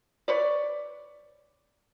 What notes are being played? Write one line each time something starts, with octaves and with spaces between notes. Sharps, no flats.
B4 C#5 D5